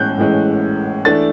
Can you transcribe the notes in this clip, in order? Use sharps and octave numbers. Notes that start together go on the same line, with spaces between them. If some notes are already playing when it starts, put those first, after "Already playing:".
Already playing: A2 E3 G#3 C#4 F#6 G6
A2 E3 G#3 C#4
E3 A3 D4 A6